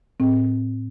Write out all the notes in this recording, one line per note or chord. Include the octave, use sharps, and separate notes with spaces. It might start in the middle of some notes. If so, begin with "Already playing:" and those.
A2 C4